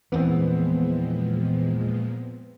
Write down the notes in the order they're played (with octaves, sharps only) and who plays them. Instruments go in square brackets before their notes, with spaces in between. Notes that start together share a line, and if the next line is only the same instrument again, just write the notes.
[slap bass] E2 E3 [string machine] A#2 F3 G#3 [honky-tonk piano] B3 C4